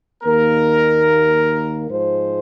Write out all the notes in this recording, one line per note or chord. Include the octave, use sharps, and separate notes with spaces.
D#2 D#3 A#3 A#4
G#2 F3 G#3 C5